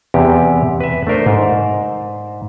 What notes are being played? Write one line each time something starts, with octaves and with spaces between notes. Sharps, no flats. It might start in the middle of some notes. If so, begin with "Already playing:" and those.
E2 C3 G4
B4 E5
A3 D4 A#4 C5
G#2